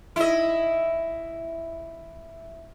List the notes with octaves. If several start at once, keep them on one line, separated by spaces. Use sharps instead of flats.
E4 D#5